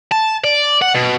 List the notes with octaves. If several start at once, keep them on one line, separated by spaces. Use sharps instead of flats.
A5
D5
F#5
B2